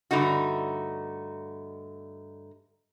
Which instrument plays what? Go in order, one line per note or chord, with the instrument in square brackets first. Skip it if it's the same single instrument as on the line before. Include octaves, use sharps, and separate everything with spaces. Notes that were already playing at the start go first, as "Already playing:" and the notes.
[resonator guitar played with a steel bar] G2 D3 A3 D#4 F#4